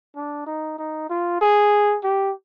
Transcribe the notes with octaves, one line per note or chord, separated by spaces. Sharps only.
D4
D#4
D#4
F4
G#4
G4